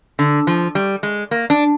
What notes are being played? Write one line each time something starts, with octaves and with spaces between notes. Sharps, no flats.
D3
F3
G3
G#3
A#3
D4